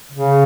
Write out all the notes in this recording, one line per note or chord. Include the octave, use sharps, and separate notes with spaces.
C#3